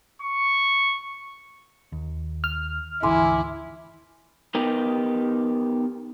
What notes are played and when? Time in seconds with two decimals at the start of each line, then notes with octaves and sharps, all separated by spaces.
0.22 C#6
1.92 D#2
2.44 F6
3.03 G#1 D2 E3 E4 G#5 C6 D6
4.55 B3 D#4 G4 A#4 B4